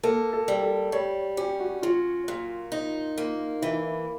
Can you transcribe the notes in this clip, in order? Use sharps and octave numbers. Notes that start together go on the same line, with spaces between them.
A#3 A4
A4
G3
A4
G3 C#5
C#4 G4
F#4
F#3 F4
A#2
D#4
A#3
E3 E4